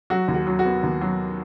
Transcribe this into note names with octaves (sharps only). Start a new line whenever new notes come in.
F#3 F#4
D#2
F#4
F#3
F#4
B3
D#2
F#3